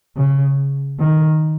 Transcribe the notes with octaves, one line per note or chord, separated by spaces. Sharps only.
C#3
D#3